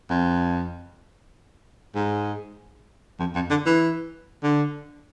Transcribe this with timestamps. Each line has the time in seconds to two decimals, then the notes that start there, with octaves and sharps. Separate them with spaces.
0.10 F2
1.95 G#2
3.20 F2
3.35 F2
3.50 D3
3.66 E3
4.43 D3